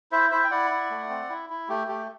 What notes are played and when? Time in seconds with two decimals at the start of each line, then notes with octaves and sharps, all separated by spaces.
0.12 E4 C5 E5
0.31 E4 C5 E5
0.44 G5
0.51 E4 D5 F#5
0.71 E4
0.90 A3
1.10 C4
1.30 E4
1.50 E4
1.69 A3 G4
1.88 A3 G4